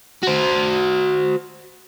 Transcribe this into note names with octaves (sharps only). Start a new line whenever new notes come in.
F#4 C5